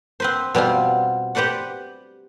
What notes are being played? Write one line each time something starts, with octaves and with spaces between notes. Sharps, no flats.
C4 B4 C5
B2 G3 C4 F4
G4 B4 C5 D5 F#5